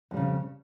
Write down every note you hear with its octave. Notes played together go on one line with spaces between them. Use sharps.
F2 C#3 G3